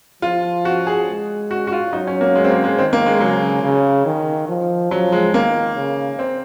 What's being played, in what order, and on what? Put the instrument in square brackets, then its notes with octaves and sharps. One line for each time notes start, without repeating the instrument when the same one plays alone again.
[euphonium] F3 [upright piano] F4
[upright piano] F#4
G#4
[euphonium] G#3
[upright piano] F#4
F#4
F4
[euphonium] F#3 [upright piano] D#4
[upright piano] C#4
A#3
G#3
C4
A#3
G#3
[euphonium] D#3 [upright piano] C4
[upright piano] A#3
G#3
[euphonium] C#3 [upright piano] F#3
[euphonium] C#3
D#3
F3
[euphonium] F3 [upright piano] F#3
[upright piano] G#3
[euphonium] D#3 [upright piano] A#3
[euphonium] C#3
[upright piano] C4